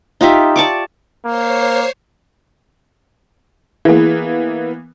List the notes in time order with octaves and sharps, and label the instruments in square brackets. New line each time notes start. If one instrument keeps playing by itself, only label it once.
[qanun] D#4 F4 G4 E5
D5 A5 C#6 D6
[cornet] A#3 [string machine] C5 C#5 C6
[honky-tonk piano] E3 A#3 B3 [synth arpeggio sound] E4 G#4